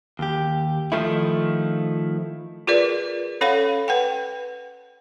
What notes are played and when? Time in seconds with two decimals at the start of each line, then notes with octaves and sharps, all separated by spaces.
0.19 D#2 G4
0.92 D#3 F3 A3 D#4 E4
2.67 F4 G#4 A#4 B4 D5
3.41 C#4 A4 C#5 F5 F#5 B5
3.88 B4 F#5 G5